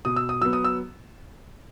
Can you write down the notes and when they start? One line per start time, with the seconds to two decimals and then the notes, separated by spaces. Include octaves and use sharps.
0.05 B2 D#6
0.16 E6
0.29 D#6
0.41 F#3 B3 E6
0.53 D#6
0.64 E6